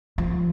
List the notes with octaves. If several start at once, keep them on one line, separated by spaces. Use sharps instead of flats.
F3